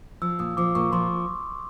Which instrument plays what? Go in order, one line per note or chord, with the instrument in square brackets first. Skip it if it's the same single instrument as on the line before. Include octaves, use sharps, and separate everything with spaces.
[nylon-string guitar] F3 [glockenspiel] E6
[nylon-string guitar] A#2 [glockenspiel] D#6
[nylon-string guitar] F3 [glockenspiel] D6
[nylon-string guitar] A#2 [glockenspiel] C#6
[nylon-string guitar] F3 [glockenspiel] C6